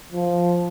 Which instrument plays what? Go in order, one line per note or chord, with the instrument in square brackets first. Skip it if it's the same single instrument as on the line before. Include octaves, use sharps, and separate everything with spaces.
[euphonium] F3